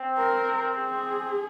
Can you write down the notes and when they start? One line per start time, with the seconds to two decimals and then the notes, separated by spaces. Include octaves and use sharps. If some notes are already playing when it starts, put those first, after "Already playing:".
Already playing: C4
0.18 A#4
0.77 G#4